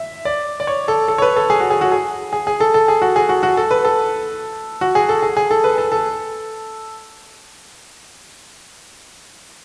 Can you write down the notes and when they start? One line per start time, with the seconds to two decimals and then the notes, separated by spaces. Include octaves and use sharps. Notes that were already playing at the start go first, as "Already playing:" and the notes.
Already playing: E5
0.25 D5
0.60 D5
0.67 C#5
0.88 A4
1.08 A4
1.18 C#5
1.22 B4
1.36 A4
1.50 G#4
1.60 F#4
1.70 G#4
1.81 F#4
1.92 G#4
2.33 G#4
2.47 G#4
2.60 A4
2.74 A4
2.88 G#4
3.02 F#4
3.16 G#4
3.29 F#4
3.43 F#4
3.57 A4
3.71 B4
3.85 A4
4.81 F#4
4.95 G#4
5.09 A4
5.22 G#4
5.37 G#4
5.51 A4
5.64 B4
5.78 A4
5.92 A4